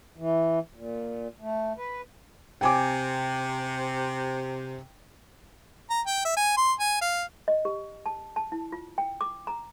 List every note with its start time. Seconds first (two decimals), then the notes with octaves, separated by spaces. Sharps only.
0.17 E3
0.75 A#2
1.40 A3
1.77 B4
2.61 C3 G5 G#5 D6
5.90 A#5
6.07 G5
6.25 E5
6.37 G#5
6.57 C6
6.80 G#5
7.01 F5
7.48 D#5
7.65 G4
8.06 A5
8.36 A5
8.52 E4
8.72 F4
8.98 G5
9.21 D6
9.47 A#5